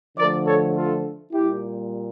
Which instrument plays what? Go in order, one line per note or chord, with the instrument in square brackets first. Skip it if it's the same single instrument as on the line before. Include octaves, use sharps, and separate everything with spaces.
[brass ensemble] D3 F3 A3 A#4 D5
A4 C#5
F4 A4
A#2 G3 E4 G4